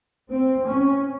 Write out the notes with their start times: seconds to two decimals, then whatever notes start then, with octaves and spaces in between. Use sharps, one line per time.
0.30 C4
0.66 C#4